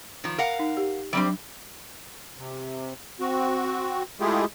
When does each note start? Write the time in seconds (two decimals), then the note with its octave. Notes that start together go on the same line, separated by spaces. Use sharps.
0.24 D#3 F3
0.38 A#4 F5 F#5
0.59 D#4
0.77 G4
1.13 F#3 G3 C4 D4 C5
2.38 C3
3.20 C4 F#4
4.20 G#3 A3 E4 F4 G4 G#4